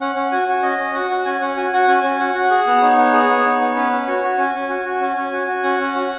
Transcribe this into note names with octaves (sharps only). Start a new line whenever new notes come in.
C#4 F#5
C#4
F#4 G#5
F#4
C#4 D#5
C#4
F#4 F#5
F#4
C#4 G#5
C#4 F#5
F#4 G#5
F#4 F#5
C#4 G#5
C#4
F#4 F#5
F#4
G#4 F#5
B3
D#4 C#5
B3
G#4
B3
D#4
B3
C#4 B4
C#4
F#4 C#5
F#4
C#4 G#5
C#4
F#4
F#4
C#4
C#4
F#4
F#4
C#4 F#5
C#4
F#4